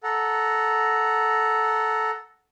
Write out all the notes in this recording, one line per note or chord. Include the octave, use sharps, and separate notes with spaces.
A4 F#5 A#5